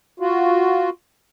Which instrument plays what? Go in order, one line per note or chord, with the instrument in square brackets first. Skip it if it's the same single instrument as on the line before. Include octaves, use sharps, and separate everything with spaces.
[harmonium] F4 F#4